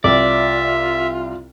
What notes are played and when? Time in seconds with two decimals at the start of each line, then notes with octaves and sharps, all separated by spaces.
0.04 C2 F4 D5 E5